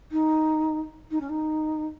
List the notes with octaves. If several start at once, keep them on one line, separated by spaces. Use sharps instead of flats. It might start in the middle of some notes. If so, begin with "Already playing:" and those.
D#4
D#4
C#4
D#4